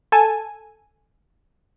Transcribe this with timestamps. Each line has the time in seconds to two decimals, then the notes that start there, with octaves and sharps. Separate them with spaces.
0.12 A4 G#5 A5